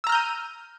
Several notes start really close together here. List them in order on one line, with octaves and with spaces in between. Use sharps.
E6 A#5 F6 G6 D#7